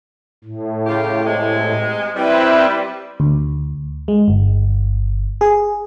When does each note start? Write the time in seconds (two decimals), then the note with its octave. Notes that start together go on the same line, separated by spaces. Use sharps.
0.44 A2
0.86 C#3 F4 G4
1.25 C3 G#3
2.16 G3 C4 E4 B4
3.20 D2
4.08 G#3
4.28 G1
5.41 G#4